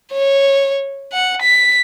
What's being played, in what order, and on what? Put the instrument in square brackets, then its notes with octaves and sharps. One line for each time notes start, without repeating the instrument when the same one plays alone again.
[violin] C#5
F#5
B6